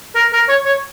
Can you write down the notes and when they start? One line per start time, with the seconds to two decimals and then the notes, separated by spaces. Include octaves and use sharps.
0.15 A#4
0.33 A#4
0.49 C#5
0.66 C#5